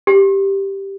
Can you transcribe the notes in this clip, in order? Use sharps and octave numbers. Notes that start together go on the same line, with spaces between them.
G4